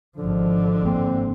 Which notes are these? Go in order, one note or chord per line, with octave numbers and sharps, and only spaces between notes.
G#1 D3 F3
G1 G#2 A#3 C4